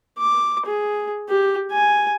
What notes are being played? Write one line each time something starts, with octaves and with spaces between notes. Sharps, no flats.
D6
G#4
G4
G#5